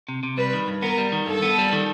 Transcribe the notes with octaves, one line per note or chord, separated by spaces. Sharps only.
C3
C3
G3 B4
D#3
G2
B3 A#4
G3
D#3
G2 A4
B3
G3
D#3